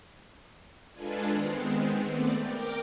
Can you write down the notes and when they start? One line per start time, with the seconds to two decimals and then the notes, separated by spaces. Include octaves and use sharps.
0.92 G#3 D4 F4 G#4 A4 B4
1.31 D#3 G#3 B3 C4
2.03 A3 B3 C4 D5
2.39 A#4 G5 D6